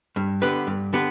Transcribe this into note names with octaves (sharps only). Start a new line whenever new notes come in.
G2
D3 B3 G4 B4
G2
D3 B3 G4 B4